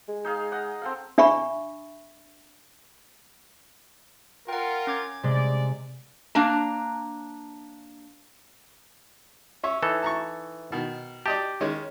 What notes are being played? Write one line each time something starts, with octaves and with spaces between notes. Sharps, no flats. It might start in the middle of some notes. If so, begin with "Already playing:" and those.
G#3
D#4 G#4 F5
D#5 F#5 D#6
C4 A4 F5
D4 E5 B5 C#6
F4 A#4 F#5 G5
C#4 D6 G#6
C3 G#3 D5
A#3 D4 A#5
C#4 C#5 E5
E3 D#4 A4
A5 A#5 C#6
B2 D#3
G4 D5 D#5 A5
D#3 G#3 C#4